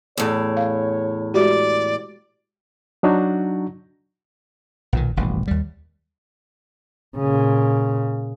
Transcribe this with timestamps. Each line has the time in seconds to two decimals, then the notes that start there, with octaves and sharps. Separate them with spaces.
0.18 E2 A2 C#5
0.57 F5
1.34 G#3 F#4 G4 D5
3.03 F#3 D4 D#4 F#4
4.93 B1 A#2 D#3
5.16 D#1 A1 G2 B2
5.48 D#2 G3
7.16 A#2 C#3